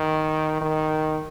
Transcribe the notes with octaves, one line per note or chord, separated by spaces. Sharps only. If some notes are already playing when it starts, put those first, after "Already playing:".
Already playing: D#3
D#3